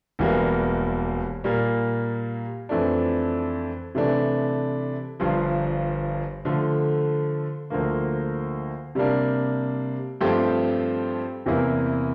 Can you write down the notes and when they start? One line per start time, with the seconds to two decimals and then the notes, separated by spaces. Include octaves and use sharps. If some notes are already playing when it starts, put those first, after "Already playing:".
0.19 E1 E2 E3 G3 A#3
1.44 A#2 G3 A#3
2.69 F2 E3 A3 D4
3.95 C3 E3 A3 D4
5.20 G1 G2 F3
6.45 D3 F3 A3
7.70 D2 D3 F3 A#3
8.95 C3 G3 A#3 D4
10.21 G2 F3 A3 C4 G4
11.46 E2 C3 E3 A#3 E4